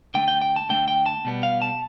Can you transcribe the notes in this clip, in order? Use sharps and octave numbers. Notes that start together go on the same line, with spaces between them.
D3 A3 G5
G5
G5
A5
D3 A3 G5
G5
A5
B2 G3 B3
F5
A5